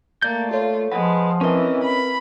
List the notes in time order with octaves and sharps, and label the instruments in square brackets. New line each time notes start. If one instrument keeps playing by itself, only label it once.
[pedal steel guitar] A3 D5 G6 [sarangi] A#3
[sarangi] F4 [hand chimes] A4 C#5
[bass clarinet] F3 [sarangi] G#3 [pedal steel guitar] B4 [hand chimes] F#5
[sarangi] E3 [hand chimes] C4 A#4 B4 [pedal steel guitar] C#4 D#5
[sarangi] B5